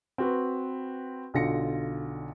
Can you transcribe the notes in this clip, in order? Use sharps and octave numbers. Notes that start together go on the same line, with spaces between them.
C4 F#4 B4
B1 D3 F4 A#6 C#7